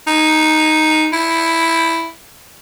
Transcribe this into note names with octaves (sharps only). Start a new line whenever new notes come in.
D#4
E4